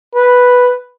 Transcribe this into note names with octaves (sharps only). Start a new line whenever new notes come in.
B4